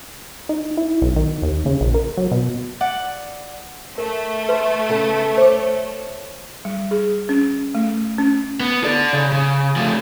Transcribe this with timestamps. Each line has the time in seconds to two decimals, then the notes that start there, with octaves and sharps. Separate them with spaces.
0.49 D#4
0.77 E4
1.02 B1
1.16 D#3
1.42 D#2
1.66 C#3
1.81 A#1
1.94 A#4
2.17 F#3
2.31 B2
2.81 D5 F#5 D6
3.98 A3 A#4
4.49 B4 C6
4.89 C#3 B3 A4
5.37 C5 C#5 D6
6.65 G3
6.91 G#4
7.29 C#4
7.75 A3
8.18 C#4
8.60 B3
8.84 A4 D5
9.13 C#3
9.32 C#3
9.76 F3 A3